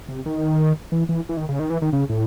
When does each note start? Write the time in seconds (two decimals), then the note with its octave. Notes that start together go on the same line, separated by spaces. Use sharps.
0.09 C3
0.26 D#3
0.92 E3
1.09 E3
1.29 E3
1.37 D#3
1.49 C#3
1.59 D#3
1.70 E3
1.82 D#3
1.93 C#3
2.09 A2